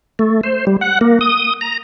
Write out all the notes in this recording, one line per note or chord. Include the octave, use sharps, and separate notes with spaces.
A3
C5
G3
F#5
A#3
D#6
A#5